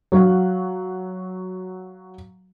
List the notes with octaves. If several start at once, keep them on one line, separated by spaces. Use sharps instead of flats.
F#3 F#4 F5 F#5